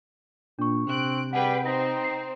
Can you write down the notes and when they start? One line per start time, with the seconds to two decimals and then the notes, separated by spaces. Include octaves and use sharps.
0.59 A#2 D4 C#6
0.87 C3 C4 F#6 D7
1.33 G3 G#4 B4 F#5 G5
1.66 C4 D#4 A#6
2.04 C7